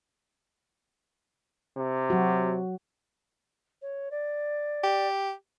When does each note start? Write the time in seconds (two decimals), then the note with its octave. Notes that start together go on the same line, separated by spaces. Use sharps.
1.77 C3
2.10 F#3 F#4
3.82 C#5
4.11 D5
4.84 G4